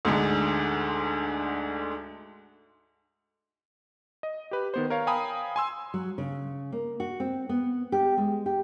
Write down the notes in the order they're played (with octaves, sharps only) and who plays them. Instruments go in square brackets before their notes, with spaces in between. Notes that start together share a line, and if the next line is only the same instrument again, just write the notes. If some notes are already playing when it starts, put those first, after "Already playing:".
[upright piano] D2 G#2 D3
[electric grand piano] D#5
G4 B4
D#3 B3 C5
A#4 C#5 F5
F5 G5 G#5 A#5 B5 D#6
G#5 C6 E6
[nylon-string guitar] F#3
C#3
A#3
F#4
C4
B3
G4
G#3
G4